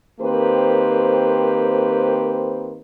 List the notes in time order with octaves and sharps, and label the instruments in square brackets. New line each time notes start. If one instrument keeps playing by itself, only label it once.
[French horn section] D#3 A#3 C4 G4 B4 C5